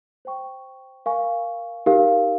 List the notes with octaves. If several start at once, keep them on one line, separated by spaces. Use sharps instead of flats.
C5 G5 C#6
A#4 F5 G#5 C#6
D#4 G4 A#4 F5